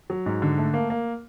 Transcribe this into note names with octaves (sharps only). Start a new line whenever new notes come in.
F#3
G#2
D3
A3
A#3
A#3